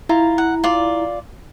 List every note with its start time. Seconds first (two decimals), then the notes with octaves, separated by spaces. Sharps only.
0.09 E4 F4 A#5
0.38 F#5
0.64 F4 D5